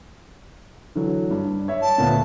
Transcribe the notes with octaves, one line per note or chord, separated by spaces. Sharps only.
D3 E3 F#3
G2
C#5 E5
A5
D2 A#2 B3